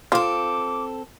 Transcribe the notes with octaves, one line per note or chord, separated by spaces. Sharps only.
C4 F4 A4 D6